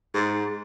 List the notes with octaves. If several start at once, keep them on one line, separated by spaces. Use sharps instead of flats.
G#2